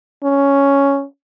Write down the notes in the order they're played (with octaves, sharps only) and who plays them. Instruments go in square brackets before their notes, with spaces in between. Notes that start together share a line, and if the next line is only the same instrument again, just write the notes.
[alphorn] C#4